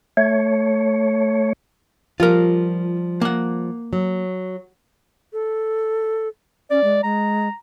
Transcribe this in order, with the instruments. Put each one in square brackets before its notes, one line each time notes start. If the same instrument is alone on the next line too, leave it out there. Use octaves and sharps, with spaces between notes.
[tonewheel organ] A3 C#5
[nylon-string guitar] F3 G3 [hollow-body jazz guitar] F4 A#4
[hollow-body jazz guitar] A#3 F#5
[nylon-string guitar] F#3
[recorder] A4
[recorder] C#4 [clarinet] D5
[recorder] G#3
[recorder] G#3 [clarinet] A#5